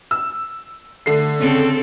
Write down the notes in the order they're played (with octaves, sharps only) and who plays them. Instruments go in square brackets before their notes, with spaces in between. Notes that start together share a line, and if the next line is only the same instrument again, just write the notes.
[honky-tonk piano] E6
D3 A3 C7
[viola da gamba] C#3 C4 A4